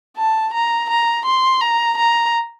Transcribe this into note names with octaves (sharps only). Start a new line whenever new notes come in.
A5
A#5
A#5
C6
A#5
A#5